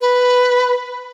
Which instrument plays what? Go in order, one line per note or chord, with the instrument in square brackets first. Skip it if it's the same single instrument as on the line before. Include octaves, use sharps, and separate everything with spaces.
[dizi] B4